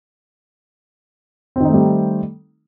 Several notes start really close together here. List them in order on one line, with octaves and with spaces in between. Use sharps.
C4 D#3 D#4 A3 G3